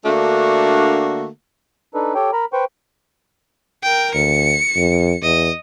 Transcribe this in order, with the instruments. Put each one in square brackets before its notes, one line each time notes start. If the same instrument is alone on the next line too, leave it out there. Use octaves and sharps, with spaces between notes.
[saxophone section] D3 A3 A#3 D4 F#4
[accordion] D4 D#4 A4 B4
G4 A4 C#5 G5
A#4 A#5 B5
B4 C5 G5 C#6
[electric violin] A#4 G5
[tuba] D2 [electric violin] C#7
[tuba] F2
[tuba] E2 [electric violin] D#5